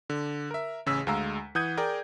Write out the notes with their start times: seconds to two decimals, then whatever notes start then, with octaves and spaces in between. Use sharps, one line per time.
0.10 D3
0.51 A#4 E5
0.86 A1 C#3 G#4 E6 B6
1.07 D2 G#3 F5 A#5 E6
1.55 E3 F#5 D#6 G6 G#6 D#7
1.77 G#4 A#4 D5 G5